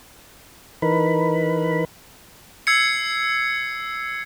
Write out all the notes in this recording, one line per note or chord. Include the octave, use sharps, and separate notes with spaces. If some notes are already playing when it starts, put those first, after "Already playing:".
E3 D#4 A#4 B4 B5
E6 G#6 C7 C#7